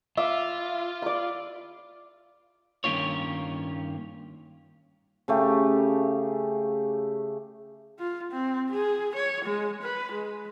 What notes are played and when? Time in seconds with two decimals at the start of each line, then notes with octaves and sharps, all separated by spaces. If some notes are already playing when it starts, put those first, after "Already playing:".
0.17 F4 E5 B5 D6
1.02 D5 B5
2.84 G2 D#3 A#3 C#4 F4 C#5
5.28 C#3 A3 G4
7.99 F4
8.32 C4
8.71 G#4
9.15 C#5
9.45 G#3
9.82 B4
10.13 G#3